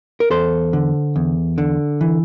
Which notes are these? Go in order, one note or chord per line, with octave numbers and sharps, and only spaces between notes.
A#4
E2 A4 C5
D3
E2
D3
E3